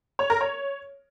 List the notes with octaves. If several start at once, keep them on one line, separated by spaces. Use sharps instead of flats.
C#5
A#4
C#5